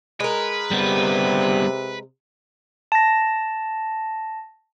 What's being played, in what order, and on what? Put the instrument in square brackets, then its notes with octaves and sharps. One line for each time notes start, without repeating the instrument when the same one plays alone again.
[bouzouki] G#3 A#4 [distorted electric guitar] B4
[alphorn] C3 [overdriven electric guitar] G3 B3
[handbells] A5 A#6